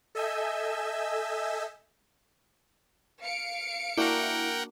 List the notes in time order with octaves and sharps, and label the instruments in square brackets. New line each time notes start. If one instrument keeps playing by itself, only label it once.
[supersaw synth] A4 D#5 E5 G#5 E6 G6
[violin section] F5 C#7 D7
[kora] A#3 D4 F#4 [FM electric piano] E4 [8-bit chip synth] A#4 F#5 G5